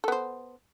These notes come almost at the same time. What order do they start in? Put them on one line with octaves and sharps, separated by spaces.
A4 B3 C5